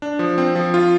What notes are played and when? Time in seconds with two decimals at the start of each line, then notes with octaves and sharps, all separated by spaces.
0.02 D4
0.19 F3
0.38 C4
0.55 F3
0.74 F4